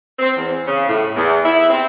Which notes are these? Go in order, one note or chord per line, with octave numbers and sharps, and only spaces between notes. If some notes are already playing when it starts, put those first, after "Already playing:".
C4
E2
C#3
A2
E2
E4
C4